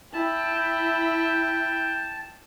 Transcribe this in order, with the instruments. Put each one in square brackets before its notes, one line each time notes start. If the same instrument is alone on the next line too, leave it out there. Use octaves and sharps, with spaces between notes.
[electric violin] E4 [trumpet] G5 [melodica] A5